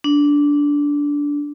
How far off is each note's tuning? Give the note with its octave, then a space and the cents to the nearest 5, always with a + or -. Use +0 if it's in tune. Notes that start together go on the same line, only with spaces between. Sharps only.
D4 -15